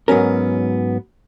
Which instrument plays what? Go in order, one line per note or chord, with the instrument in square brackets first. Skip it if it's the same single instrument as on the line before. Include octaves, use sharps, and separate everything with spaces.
[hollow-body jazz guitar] G#2 F#3 B3 C#4 A#4